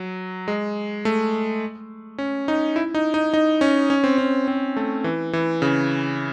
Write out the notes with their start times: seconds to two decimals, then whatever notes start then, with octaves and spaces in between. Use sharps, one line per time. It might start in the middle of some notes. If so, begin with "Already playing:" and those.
Already playing: F#3
0.48 G#3
1.05 A3
2.18 C#4
2.48 D#4
2.76 E4
2.94 D#4
3.14 D#4
3.34 D#4
3.61 C#4
3.90 C#4
4.04 C4
4.18 C#4
4.48 C4
4.77 A3
5.04 E3
5.33 E3
5.62 C#3